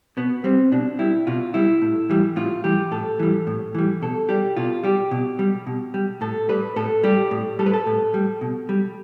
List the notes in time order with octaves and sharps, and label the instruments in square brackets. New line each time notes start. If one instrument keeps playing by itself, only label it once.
[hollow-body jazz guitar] B2 B3
G3 C4
B2 D4
G3 E4
B2 F4
G3 E4
A2
E3 G3
A2 F4
E3 G3 G4
A2 A4
E3 G3
A2
E3 G3
B2 A4
G3 G4
B2 F4
G3 G4
B2
G3
B2
G3
A2 A4
G3 B4
A2 A4
G3 G4
A2
G3 A4
B4
A4
A2
G3
B2
G3